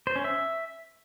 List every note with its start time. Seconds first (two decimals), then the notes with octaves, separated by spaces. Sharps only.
0.07 C5
0.16 C#4
0.24 E5